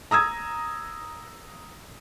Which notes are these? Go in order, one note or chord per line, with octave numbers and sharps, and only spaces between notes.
A#5 D#6 E6 G#6